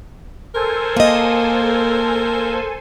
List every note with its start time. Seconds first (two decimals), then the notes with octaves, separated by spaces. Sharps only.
0.55 A4 A#4 C5 G#5
0.97 A#3 D#5